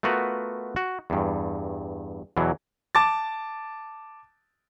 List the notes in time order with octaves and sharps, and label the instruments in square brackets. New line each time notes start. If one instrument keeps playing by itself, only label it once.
[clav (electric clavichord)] A3 B3 F4 F#4 A#4 B4
F#4
E2 G2
E2 B2 E3 F#3
[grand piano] A5 D6 A6